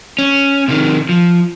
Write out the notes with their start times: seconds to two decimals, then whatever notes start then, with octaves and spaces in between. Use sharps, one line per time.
0.19 C#4
0.68 C3 D#3
1.09 F3